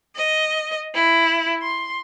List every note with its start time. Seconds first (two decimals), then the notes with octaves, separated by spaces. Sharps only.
0.15 D#5
0.95 E4
1.62 C6